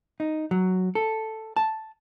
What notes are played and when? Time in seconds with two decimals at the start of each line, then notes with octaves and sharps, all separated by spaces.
0.20 D#4
0.51 F#3
0.95 A4
1.57 A5